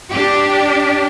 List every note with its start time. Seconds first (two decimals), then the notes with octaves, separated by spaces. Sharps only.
0.11 D4 G4